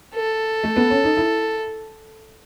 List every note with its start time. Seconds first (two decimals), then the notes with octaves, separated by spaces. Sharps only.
0.15 A4
0.64 A3
0.77 B3
0.90 C#4
1.04 D#4
1.17 E4